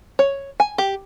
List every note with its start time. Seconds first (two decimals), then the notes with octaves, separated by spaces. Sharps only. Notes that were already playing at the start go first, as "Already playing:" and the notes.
0.19 C#5
0.60 G#5
0.78 G4